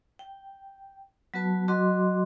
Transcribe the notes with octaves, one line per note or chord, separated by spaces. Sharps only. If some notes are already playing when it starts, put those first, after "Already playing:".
G5
F#3 B3 F#4 B4 A5
F#3 F#4 D#5 C6 D6